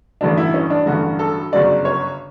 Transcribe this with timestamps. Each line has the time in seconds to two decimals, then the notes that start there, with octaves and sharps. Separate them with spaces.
0.21 A1 G2 D3 F#3 D4
0.37 E4
0.54 C#4
0.70 D4
0.86 A1 G2 D3 F#3 F#4
1.19 A4
1.52 G1 F#2 C#3 F#3 D5
1.85 C#5